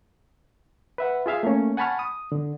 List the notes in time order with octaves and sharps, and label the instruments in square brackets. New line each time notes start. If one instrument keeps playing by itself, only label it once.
[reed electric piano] B4 E5 F#5
F4 G#4 E5 F5
A3 A#3 C#4
F#5 G#5 A5 B5 C#6 F6
D#6
D3